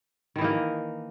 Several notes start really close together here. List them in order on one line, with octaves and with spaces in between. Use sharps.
D#3 E3 D#4 A#3